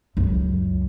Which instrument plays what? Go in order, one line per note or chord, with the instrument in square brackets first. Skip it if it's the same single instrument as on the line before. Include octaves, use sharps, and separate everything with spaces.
[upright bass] C#2 F#2